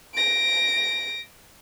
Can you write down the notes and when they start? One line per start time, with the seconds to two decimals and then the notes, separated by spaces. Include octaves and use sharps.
0.15 A#6 D7